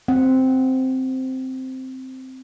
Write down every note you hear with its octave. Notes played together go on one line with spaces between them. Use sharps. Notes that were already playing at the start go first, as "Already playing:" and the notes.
C4 F#5